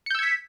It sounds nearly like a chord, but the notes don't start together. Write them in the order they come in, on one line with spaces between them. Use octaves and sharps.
C#7 G6 E6 G#6 B6